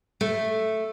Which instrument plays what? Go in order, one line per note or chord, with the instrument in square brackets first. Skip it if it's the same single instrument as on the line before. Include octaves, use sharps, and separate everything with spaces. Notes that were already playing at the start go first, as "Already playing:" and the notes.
[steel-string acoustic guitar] A3